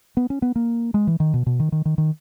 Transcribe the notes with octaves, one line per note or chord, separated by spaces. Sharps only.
B3
C#4
B3
A#3
G#3
E3
D#3
B2
B2
D#3
D#3
D#3
D#3